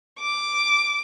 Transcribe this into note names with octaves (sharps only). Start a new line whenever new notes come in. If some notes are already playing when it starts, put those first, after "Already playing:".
D6